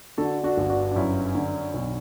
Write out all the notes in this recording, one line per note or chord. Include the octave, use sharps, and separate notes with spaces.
D3 F#4 A4
D4 F#4
G1
D4 F#4
D4
F#2 C#4 E4
D3
B1